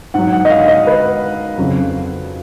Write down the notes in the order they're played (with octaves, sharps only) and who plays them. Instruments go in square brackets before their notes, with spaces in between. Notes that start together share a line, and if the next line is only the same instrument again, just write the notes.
[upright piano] G#2 F#3 F#5
F#5
D#5
F5
D#5
B4
F2 C#3 F#3